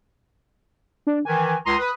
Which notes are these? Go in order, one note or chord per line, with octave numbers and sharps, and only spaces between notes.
D4
D#3 E3 G#5
C#2 A#5 C6 D#6
B4